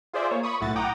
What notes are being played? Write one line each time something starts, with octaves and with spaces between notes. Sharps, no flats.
F4 G#4 C5 D5 E5
A#3 C#5
B5 C#6 D#6
B1 A2 E4 F#4 A6
F#5 G5 A#5 D6 D#6